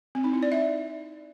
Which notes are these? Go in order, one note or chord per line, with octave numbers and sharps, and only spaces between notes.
C4
D#4
E4
D5
E5